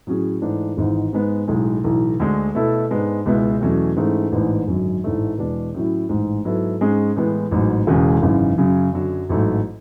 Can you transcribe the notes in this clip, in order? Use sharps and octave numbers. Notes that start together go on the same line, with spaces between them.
A2 F#3 C#4 G#4
G#2 E3 A3 D4
G#1 G#2 E3
G#2 G#3 B3
B1 A2 G#3
B1 A2 E3
D2 D3 G#3 D4
B2 A3 E4 A4
G#2 G#3 B3 D4
C#2 B2 G#3 B3 E4
E2 B2 F#3 A3 C#4
G#2 E3 A3 C#4 G#4
A1 G#2 E3 B3 D4
G#1 F#2 D3 F#3
A1 G#2 E3 A3 D4
E2 B2 G#3 D4
A2 F#3 C#4 E4
A1 G#2 G#3
G#2 F#3 B3 E4 A4
G#2 G#3 C#4 G#4
A2 E3 G#3 B3
A1 G#2 F#3
E1 E2 C#3 G#3
G#1 F#2 C#3 E3
F#2 C#3 F#3
F#2 D3 F#3
A1 G#2 F#3 A3